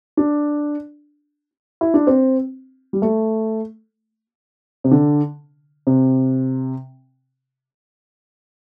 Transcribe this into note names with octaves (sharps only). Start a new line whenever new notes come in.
D4
E4
D4
C4
G3
A3
C3
D3
C3